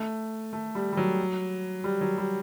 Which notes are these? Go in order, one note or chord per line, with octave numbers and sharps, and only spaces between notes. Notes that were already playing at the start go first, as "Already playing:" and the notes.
Already playing: A3
A3
G3
G3
F#3
G3
F#3
G3